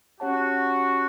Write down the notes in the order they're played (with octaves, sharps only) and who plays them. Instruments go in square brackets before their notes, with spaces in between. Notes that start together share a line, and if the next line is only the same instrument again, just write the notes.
[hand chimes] C#4 G4 C#5 F#5 A5 [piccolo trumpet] F#4